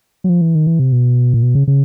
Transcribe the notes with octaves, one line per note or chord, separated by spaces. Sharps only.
F#3
F3
E3
D#3
E3
C3
B2
A#2
B2
C#3
C#3